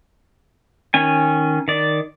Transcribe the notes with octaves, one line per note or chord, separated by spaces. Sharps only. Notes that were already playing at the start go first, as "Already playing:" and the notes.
D#3 C#4 G#5
D#3 D5